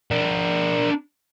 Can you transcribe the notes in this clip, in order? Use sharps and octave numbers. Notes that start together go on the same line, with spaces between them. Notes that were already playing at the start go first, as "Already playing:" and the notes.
D4 A#4